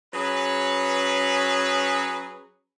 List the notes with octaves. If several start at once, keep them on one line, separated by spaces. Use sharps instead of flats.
F#3 C#4 G#4 B4